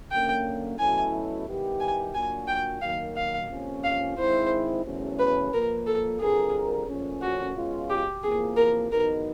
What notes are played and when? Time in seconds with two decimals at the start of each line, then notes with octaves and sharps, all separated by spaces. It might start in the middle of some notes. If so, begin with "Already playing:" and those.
0.11 F#2 D3 F#3 A#3 C#4 G5
0.79 B2 F#3 A3 C#4 E4 G#5
1.47 D#3 G3 B3 E4 G4
1.80 G#5
2.14 A#2 F#3 A#3 D4 F#4 G#5
2.48 G5
2.82 D#3 F#3 A#3 F5
3.17 F5
3.50 F2 C3 F3 A#3 C#4
3.84 F5
4.17 G#2 D#3 G#3 C4 E4 C5
4.85 E2 C#3 F#3 A3 C#4
5.19 B4
5.53 A#2 F3 A#3 A#4
5.87 A4
6.20 D3 G3 C4 F4 G#4 A#4
6.88 A#2 F3 A3 C#4
7.22 F#4
7.55 B2 G#3 C#4 F4
7.90 G4
8.23 E2 C3 F3 A#3 G#4
8.57 A#4
8.91 E2 B2 F#3 B3 D#4 A#4